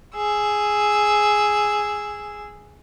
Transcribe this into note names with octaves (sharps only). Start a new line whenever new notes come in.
G#4 E6